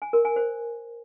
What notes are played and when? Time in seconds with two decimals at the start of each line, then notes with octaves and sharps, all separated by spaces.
0.02 G#5
0.13 A#4
0.25 G#5
0.36 C5